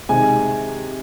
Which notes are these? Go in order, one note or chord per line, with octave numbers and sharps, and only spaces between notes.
C3 D#3 G#3 G#5